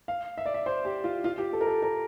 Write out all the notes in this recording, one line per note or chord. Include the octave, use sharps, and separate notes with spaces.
F5
E5
D5
E5
C5
G4
F4
F4
G4
A4
A#4
A4
A#4